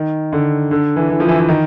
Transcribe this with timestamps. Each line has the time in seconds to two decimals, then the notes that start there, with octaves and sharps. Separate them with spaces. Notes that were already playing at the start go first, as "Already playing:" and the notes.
Already playing: D#3
0.33 D3
0.71 D3
0.96 E3
1.10 E3
1.20 F3
1.29 E3
1.39 E3
1.48 D#3